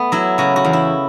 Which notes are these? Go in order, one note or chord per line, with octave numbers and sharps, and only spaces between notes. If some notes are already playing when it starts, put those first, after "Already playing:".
Already playing: A3 B3
F#3 E4
C#3 F#4
F#4
E2
E4